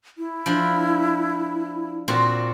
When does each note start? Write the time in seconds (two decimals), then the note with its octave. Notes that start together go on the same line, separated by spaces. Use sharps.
0.18 E4
0.46 F3 D4
2.08 A#2 C4 F#4